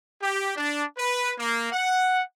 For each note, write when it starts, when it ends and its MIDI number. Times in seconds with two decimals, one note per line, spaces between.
0.21 0.56 67
0.57 0.84 62
0.98 1.32 71
1.38 1.71 58
1.72 2.20 78